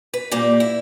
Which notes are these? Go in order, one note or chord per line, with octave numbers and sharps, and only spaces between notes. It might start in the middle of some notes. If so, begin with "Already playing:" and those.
B4
A#2 G3 A#3
E4